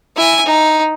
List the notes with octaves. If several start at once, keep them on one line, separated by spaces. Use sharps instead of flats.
E4 G#5
D#4